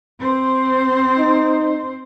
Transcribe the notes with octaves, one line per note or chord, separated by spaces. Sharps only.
C4 C5
D#4